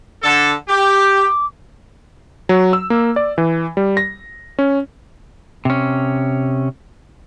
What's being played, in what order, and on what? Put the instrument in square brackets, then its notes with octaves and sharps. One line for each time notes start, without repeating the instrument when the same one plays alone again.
[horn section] D3 A4
[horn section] G4 [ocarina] D6
[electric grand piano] F#3
E6
A#3
D5
E3
G3
A#6
C#4
[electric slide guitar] C3 C#4